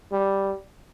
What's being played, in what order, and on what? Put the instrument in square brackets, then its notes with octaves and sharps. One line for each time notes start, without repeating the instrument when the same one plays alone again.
[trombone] G3